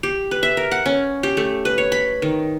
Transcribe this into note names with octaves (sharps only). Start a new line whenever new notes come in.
G4
B4
E5
A#4
F#5
C#4
G4
A3
B4
C#5
B5
D#3